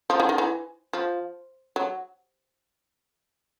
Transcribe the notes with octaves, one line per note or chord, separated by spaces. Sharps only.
F3
E3
D#3
E3
F3
F#3